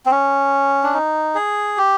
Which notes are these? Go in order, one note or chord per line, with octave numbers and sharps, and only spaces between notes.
C4
C#4
D4
D#4
G#4
G4